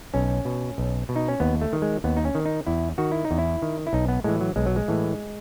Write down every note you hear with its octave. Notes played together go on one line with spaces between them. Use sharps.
B1 C#4
B2
B1
B2
D#4
C#4
D#2 B3
A3
D#3
G#3
D#2 B3
D#4
C#4
D#3
D#4
E2 E4
D#3 F#4
E4
D#4
E2
E4
D#3
E4
B1 D#4
B3
A2 E3 G#3
F#3
B1 G#3
F#3
G#3
A2 E3